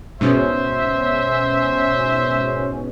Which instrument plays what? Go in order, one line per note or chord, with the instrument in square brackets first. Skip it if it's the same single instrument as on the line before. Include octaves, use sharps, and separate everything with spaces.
[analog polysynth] G#2 B2 C#4 [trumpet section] C5 E5